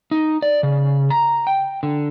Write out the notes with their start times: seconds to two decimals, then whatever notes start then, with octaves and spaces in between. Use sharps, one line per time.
0.11 D#4
0.42 D5
0.63 C#3
1.10 A#5
1.47 G5
1.83 D3